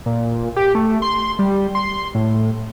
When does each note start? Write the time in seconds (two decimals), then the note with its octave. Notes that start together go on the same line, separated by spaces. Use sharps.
0.06 A#2
0.56 G4
0.75 A3
1.02 C6
1.39 G3
1.75 C6
2.15 A2